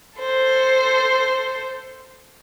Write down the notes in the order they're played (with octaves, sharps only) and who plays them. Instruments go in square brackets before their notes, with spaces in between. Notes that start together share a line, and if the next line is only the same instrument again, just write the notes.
[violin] A4 C5